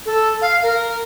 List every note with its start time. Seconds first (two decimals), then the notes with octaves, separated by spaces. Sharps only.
0.06 A4
0.42 F5
0.63 A#4